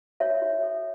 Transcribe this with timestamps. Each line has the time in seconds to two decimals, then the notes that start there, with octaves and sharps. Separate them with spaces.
0.20 F#4 C#5 E5
0.42 F#4
0.63 A4